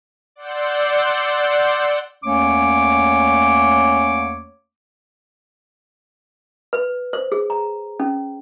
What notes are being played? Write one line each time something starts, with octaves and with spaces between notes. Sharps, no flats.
D5 F#5 C6 E6 G6
E2 A3 A#3 C#4 C#5 D6
B4
C5
G#4
A#5
C#4